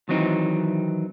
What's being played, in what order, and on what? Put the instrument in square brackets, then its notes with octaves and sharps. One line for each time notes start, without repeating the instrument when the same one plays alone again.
[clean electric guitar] D#3 E3 F#3 C4 D#4